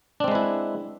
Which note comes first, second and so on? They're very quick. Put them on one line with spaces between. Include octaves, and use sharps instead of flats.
D4 C4 G#3 B4 E4